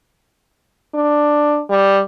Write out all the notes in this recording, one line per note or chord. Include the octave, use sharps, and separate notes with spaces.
D4
G3